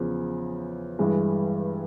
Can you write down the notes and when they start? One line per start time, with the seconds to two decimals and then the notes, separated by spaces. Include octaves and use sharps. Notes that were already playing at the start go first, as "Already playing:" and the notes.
Already playing: E2 C#3 F3
0.99 G2 E3 G#3